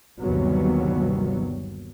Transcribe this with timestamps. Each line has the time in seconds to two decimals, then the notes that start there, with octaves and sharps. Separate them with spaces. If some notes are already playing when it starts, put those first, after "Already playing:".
0.21 G1 D#2 C3 F#3 G3 B3